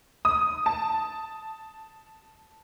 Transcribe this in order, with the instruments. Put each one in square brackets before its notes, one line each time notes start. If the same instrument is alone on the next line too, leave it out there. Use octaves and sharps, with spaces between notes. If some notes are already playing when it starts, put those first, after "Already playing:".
[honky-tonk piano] D#6
A5